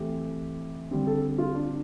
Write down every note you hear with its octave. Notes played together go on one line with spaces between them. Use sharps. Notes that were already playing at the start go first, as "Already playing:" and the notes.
Already playing: E3 A3 C4 G4
D3 G3 C4
A4
F4
D4